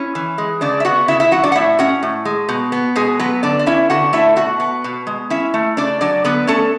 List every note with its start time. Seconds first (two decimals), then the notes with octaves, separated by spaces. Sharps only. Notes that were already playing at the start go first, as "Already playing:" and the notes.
Already playing: C#4 E4
0.15 E3
0.38 G#3
0.61 C#3 D4 D5
0.80 E5
0.85 B3 F#4 F#5
1.08 C#3 E4 E5
1.20 E4 E5
1.31 F#3 F#4 F#5
1.43 D4 D5
1.52 F#5
1.55 A2 E4 E5
1.79 C#4 F#4 F#5
2.03 A2
2.25 G#3
2.49 B2
2.72 B3
2.96 B2 G#3 G#4
3.19 F#3 B3 B4
3.43 D3 D4 D5
3.59 D5
3.66 C#4 E4 E5
3.90 D3 F#4 F#5
4.13 A3 E4 E5
4.36 B2 F#4 F#5
4.60 B3
4.84 B2
5.07 G#3
5.30 C#4 E4 E5
5.54 A3
5.77 C#3 D4 D5
6.01 F#3 D4 D5
6.24 D3 B3 B4
6.47 A3 C#4 A4